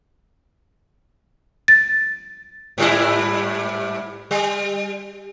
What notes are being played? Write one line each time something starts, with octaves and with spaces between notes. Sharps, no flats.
A6
G#2 G3 E4
G3